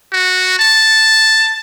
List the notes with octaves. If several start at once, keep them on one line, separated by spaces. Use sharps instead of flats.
F#4
A5